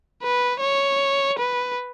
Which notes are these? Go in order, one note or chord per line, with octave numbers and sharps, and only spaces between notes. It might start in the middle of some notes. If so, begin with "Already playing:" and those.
B4
C#5
B4